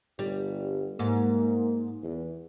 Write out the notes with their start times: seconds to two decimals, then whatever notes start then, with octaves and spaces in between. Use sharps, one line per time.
0.19 G1 G3
0.99 G#2 A#3
2.02 E2